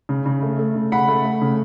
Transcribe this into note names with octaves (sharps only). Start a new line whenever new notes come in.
C#3
C#3
A3
A3
C#3
C#3 F#5 B5
A3
A3
C#3